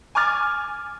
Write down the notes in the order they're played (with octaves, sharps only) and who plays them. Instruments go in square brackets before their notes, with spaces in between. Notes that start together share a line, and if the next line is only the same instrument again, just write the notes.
[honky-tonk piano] G#5 C#6 D6 F6 A6